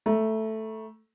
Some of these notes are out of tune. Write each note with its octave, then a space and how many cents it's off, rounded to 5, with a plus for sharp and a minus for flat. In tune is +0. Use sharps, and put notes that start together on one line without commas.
A3 +0 A#5 +35